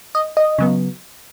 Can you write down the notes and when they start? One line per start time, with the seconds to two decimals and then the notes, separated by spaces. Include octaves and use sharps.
0.15 D#5
0.37 D#5
0.58 C#3 F#3 B3